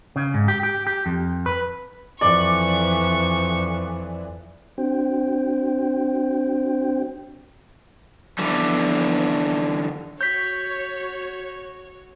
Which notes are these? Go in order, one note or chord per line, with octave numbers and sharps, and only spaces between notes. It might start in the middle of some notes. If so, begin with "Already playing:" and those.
C#3
G#2
G4
G4
G4
F2
B4
F2 E3 D5 C#6
C4 D4 F#4 C5 G5
D3 E3 F3 G3 B3
F#4 C#5 G6 B6